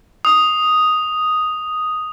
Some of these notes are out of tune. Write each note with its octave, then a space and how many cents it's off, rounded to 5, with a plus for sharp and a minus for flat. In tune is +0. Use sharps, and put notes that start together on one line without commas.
D#6 +0